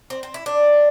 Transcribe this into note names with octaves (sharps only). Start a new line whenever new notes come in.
C4
C4
E4
D4